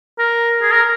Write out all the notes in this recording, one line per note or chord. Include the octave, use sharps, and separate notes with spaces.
A#4
G#4
A#4